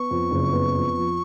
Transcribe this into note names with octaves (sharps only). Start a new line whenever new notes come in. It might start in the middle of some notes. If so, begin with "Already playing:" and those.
Already playing: B3 C#6
F2
F#1
B3
F2
F3